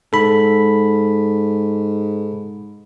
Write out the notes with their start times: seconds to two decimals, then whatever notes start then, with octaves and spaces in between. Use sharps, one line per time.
0.13 G#2 A4 B5